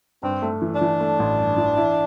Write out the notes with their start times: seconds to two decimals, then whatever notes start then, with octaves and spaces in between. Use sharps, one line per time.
0.23 G2 C4
0.42 A3
0.62 E3
0.75 D4
0.81 E3
1.00 A3
1.19 A1
1.39 G2
1.57 E3
1.77 E4